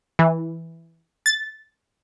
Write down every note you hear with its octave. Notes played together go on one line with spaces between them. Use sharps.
E3
A6